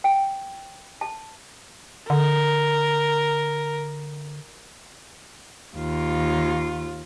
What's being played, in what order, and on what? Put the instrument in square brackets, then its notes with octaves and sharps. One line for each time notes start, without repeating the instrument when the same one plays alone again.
[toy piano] G5
A5
[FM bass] D3 [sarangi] A#4
[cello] D#2 F4